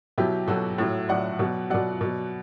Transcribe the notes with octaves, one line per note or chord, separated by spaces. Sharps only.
B2 F#3 E4 G4
B2 F#3 F#4 A4
A2 F#3
A2 F#3 D5 F#5
B2 F#3
B2 F#3 D5 F#5
B2 F#3